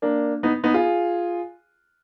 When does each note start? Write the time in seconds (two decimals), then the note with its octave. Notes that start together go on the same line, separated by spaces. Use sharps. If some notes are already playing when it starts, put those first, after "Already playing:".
0.02 A#3 D4
0.43 B3 D#4
0.64 B3 D#4
0.74 F4 G#4